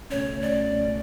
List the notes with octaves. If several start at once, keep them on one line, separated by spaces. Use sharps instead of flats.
C#2 B2 A3 C#4 C#5
D5
C#2 B2 A3 C#4